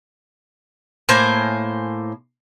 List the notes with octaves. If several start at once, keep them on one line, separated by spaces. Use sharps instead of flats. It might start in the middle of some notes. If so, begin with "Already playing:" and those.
A2 A#3 C5 G#5